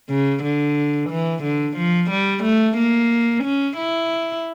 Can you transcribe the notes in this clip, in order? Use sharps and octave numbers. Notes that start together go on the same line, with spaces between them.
C#3
D3
E3
D3
F3
G3
A3
A#3
C#4
E4